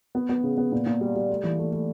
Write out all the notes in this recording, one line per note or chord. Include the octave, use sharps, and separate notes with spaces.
B3
B3
C#3
B3
A#2
A#2
G3
G3
A3
E3
A3
A3